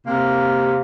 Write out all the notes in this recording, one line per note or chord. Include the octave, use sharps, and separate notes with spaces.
C3 A#3